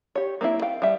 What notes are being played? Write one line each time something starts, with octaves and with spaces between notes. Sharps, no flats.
G4 C#5
A#3 C4 D#4 E4
F5 G5
G3 E5